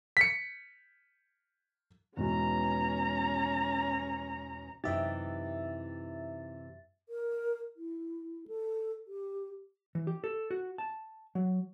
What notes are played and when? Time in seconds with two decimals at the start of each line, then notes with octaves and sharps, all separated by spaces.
0.17 B6 C#7
2.17 E2 G#2 B2 C#4 A#5
4.84 F#2 C3 E3 D#4 G4 D#5 E5 A6
7.09 A#4
7.77 E4
8.48 A4
9.07 G4
9.95 E3
10.07 G4
10.24 A4
10.51 F#4
10.78 A5
11.35 F#3